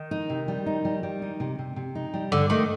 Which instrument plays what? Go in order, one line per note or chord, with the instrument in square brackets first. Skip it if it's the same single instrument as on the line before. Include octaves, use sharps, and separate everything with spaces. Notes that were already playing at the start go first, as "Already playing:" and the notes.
Already playing: [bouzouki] D#3
[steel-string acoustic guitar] D#4
C3
G3
D#4
G3
G3
D#4
C3
C3
C3
D#4
G3
[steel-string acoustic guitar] G2 [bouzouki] D3
[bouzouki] D#3 [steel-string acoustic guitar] A3